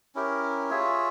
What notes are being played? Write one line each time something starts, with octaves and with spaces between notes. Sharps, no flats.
C#4 E4 G4 A#4
F4 G#4 C#5 E5